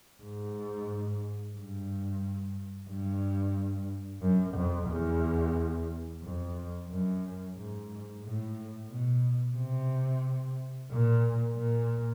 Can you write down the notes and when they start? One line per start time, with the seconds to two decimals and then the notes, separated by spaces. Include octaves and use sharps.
0.22 G#2
1.56 G2
2.89 G2
4.21 F#2
4.55 F2
4.88 E2
6.23 F2
6.89 F#2
7.56 G#2
8.22 A2
8.90 B2
9.56 C3
10.90 A#2
11.56 A#2